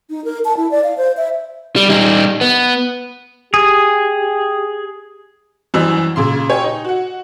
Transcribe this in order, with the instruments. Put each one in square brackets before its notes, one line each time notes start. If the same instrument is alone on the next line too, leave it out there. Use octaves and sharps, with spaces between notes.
[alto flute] D#4
A#4
A5
E4
D5
F5
C5
E5
[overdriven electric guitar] G3
G3 D#4
B3
[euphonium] G4 [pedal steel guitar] G#4
[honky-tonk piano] F#2 E3 G3 C5 D#5 E6
A#2 C#3 C6
G4 C#5 G#5
D#4
F#4 F#5